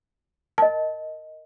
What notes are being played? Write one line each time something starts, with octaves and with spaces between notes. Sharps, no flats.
A#4 D#5 A5